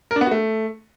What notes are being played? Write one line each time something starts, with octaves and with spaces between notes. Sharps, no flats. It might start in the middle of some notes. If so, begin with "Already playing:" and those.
A#4
D4
B3
F#4
A3